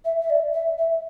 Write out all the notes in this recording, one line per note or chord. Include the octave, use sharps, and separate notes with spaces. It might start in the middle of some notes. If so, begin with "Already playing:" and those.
E5
E5
D5
E5
E5